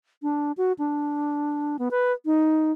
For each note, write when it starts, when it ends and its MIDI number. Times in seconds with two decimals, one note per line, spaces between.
0.23 0.52 62
0.57 0.73 66
0.79 1.77 62
1.79 1.89 59
1.91 2.12 71
2.26 2.72 63